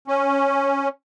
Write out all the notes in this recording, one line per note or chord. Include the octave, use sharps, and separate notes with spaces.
C#4